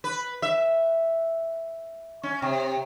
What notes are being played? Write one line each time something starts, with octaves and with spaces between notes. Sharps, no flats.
B4
E5
C#4
C3